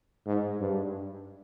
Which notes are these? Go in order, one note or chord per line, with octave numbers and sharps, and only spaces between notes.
G#2
G2